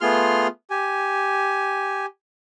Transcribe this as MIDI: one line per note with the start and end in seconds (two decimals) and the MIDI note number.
0.01 0.47 57
0.01 0.47 59
0.01 0.47 65
0.01 0.47 68
0.01 0.47 84
0.01 0.47 89
0.70 2.06 67
0.70 2.06 80